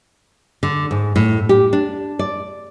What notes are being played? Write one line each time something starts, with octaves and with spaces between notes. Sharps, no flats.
D3
G#2
A2
G4
D4
D5